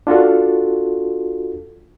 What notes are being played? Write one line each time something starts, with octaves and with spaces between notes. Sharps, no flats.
D4 F4 F#4 A4